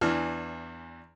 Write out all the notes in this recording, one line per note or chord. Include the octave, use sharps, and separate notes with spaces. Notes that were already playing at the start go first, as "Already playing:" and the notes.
E2 E3 D4 F6